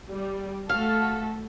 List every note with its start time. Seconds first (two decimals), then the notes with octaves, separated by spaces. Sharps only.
0.10 G3
0.70 A3 F#4 A4 F5